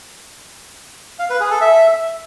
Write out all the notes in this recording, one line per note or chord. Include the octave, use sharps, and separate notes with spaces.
F5
B4
G#4
A4
E5